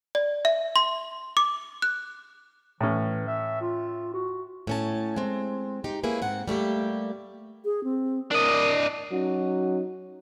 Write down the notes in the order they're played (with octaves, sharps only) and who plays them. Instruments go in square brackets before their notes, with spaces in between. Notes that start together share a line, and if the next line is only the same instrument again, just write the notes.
[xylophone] D5
E5
C6
D6
F#6
[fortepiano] A2 C#4 [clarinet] E3
[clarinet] E5
F4
F#4
[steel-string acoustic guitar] A2 C#4 A5
G#3 C4
D#4 G4
G#3 A#3 C#4 E4 G#4 B4
G#2 C4 F#5
G3 A3 A#3 G4
[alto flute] G#4
C4
[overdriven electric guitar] D4 D#5 [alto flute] A#4
[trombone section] F#3 C#4 D#4 F#4